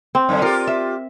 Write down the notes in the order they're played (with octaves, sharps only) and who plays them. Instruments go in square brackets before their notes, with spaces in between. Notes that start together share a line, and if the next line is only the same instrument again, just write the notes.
[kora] C4
[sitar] F#2 D3
[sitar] F4 G4 [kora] A#4
[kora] E5